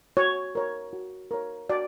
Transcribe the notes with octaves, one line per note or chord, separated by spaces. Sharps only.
F#4 C#5
A#4 C#5
F#4
A#4 C#5
F#4 D5